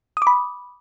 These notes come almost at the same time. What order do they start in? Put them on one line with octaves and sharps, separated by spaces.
D#6 D6 B5